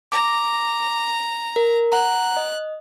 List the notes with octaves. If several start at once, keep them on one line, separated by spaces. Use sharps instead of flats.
A#5 D6 A#6
A#4
F#5 A#5 F#6
D#5